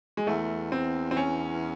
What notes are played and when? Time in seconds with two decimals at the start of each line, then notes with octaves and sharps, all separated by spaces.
0.17 G#3
0.27 E2 A3
0.72 C4
1.11 C4
1.17 C#4